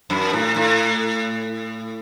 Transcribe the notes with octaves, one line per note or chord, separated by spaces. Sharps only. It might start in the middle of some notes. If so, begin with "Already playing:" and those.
F#2
A2
A2